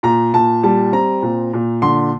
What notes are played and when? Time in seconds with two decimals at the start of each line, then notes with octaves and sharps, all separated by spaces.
0.03 A#2 A#5
0.34 A#2 A5
0.63 G3 A5
0.92 C4 A#5
1.22 A#2
1.53 A#2
1.82 D3 C6